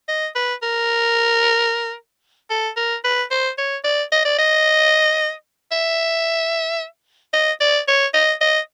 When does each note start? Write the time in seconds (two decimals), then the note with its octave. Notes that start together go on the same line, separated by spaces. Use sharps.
0.08 D#5
0.35 B4
0.63 A#4
2.50 A4
2.76 A#4
3.04 B4
3.31 C5
3.58 C#5
3.84 D5
4.12 D#5
4.25 D5
4.38 D#5
5.72 E5
7.33 D#5
7.60 D5
7.88 C#5
8.14 D#5
8.41 D#5